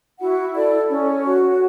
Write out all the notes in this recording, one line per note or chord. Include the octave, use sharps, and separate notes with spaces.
E4 F#4 F#5
A4 D5
C#4 C#5
F#4